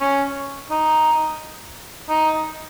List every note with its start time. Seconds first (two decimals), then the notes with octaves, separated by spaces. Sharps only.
0.01 C#4
0.70 D#4
2.09 D#4